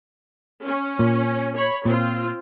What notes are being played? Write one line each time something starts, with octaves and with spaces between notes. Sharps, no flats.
C#4
A#2
C#5 B5
A#2 C4 F4